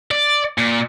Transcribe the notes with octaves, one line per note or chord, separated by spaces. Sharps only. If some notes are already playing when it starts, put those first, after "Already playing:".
D5
A#2